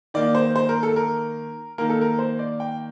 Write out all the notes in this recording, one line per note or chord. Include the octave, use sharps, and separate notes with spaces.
D#3 A#3 D5
C5
C5
A#4
A4
A#4
D#3 A#3 A#4
A4
A#4
C5
D5
G5